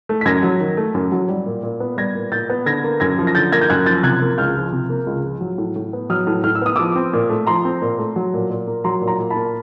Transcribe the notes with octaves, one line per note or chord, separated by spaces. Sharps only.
A3
B6
F#2 G#6 A#6
F#3
D#3
A3
F#2
F#3
G3
A#2
A#2
B3
G3 G#6 A#6
A#2
A#2 G6 A6
B3
D3 G#6 A#6
A#3
F#2 G#6 A#6
F3
A#6
D3 G6 A6
A#3 G#6 A#6
G6
F#2 F#6 G#6
F3 G6 A6
C3 F#6 G#6
A#3
C#2 F6 G6
F3
C3
A#3
C#2
F3
F#3
A2
A2
B3
F#3 D#6 F6
A2
A2 F6
E6
B3 D#6
F3 D6 E6
C4
A#2
A3
F3 A#5 C6
C4
A#2
A3
F#3
A#2
A#2
A#3
F#3 A#5 C6
A#2
A#5 C6
A#2
A5 B5
A#3